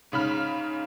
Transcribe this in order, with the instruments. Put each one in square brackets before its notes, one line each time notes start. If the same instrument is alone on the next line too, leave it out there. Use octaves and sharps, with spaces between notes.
[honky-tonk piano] G#2 C#3 B5 F6